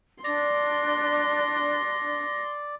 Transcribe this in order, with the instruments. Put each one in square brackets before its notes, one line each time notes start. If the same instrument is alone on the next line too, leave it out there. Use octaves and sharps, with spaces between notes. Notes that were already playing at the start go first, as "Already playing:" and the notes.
[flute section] D4 [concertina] D5 [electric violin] C6 [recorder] A#6